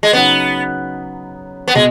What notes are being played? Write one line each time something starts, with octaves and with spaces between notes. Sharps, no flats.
G#3
C#3 F#3 B3 D#4
B3
B2 G#3